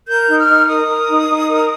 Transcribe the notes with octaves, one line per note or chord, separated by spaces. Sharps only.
A#4 G6
D#4
F6
D#4
A#4 D#6
A#4
D#4
D#4
A#4